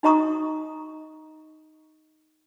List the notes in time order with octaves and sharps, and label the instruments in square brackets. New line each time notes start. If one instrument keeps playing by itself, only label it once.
[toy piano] D#4 F#4 D#5 A#5 C#6 D#6